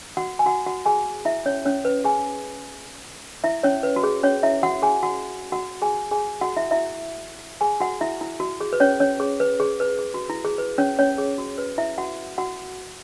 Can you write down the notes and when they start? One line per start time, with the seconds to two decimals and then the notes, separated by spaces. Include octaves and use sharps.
0.17 F#4 F#5
0.39 G#5
0.46 F#4 F#5
0.66 F#4 F#5
0.86 G#4 G#5
1.25 E4 E5
1.46 C#4 C#5
1.65 C#4 C#5
1.85 B4
2.04 G#4 G#5
3.44 E4 E5
3.63 C#4 C#5
3.83 B4
3.96 F#4
4.04 G#4
4.23 C#4 C#5
4.43 E4 E5
4.63 F#4 F#5
4.82 G#4 G#5
5.03 F#4 F#5
5.52 F#4 F#5
5.82 G#4 G#5
6.11 G#4 G#5
6.41 F#4 F#5
6.57 E4 E5
6.71 E4 E5
7.61 G#4 G#5
7.80 F#4 F#5
8.01 E4 E5
8.21 E4
8.40 F#4
8.61 G#4
8.73 B4
8.80 C#4 C#5
9.00 C#4 C#5
9.20 G#4
9.40 B4
9.60 G#4
9.80 B4
9.99 G#4
10.14 F#4
10.30 E4
10.45 G#4
10.58 B4
10.78 C#4 C#5
10.99 C#4 C#5
11.18 G#4
11.38 F#4
11.58 B4
11.78 E4 E5
11.98 F#4 F#5
12.38 F#4 F#5